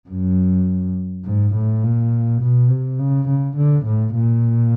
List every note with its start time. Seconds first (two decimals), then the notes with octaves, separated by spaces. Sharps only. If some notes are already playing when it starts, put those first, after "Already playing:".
0.09 F#2
1.25 G#2
1.55 A2
1.83 A#2
2.42 B2
2.70 C3
2.99 C#3
3.28 C#3
3.56 D3
3.86 A2
4.14 A#2